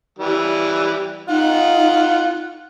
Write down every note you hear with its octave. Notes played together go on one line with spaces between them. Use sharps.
E3 G3
D#4 F4 F#5